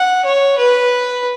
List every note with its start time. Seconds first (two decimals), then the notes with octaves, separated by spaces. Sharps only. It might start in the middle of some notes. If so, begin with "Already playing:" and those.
Already playing: F#5
0.25 C#5
0.57 B4